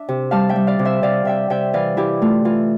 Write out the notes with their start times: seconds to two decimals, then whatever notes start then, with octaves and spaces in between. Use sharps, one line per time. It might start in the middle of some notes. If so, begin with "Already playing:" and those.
Already playing: D4 E5
0.09 C3
0.31 G3 F5 A5
0.49 E5 G5
0.56 G3
0.67 D5 F5
0.79 C3
0.85 C5 E5
1.03 C3 D5 F5
1.25 C3 E5 G5
1.50 C3 E5 G5
1.74 E3 D5 F5
1.97 E3 E4 G4
2.21 A3 F4
2.45 E3 F4